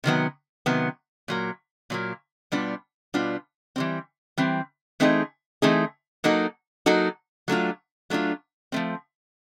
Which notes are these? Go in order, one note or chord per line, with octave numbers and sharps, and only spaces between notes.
C3 D#3 F#3 B3
C3 D#3 F#3 B3
A#2 F#3 A#3
A#2 F#3 A#3
B2 G3 B3 D4 F4
B2 G3 B3 D4 F4
E3 G3 C4
E3 G3 C4
E3 A3 C4 D#4 G#4
E3 A3 C4 D#4 G#4
F#3 A#3 D#4 F#4 A4
F#3 A#3 D#4 F#4 A4
F#3 A3 D4 F4
F#3 A3 D4 F4
F3 A3 C4